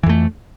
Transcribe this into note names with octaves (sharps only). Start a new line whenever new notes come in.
F2 E3 A3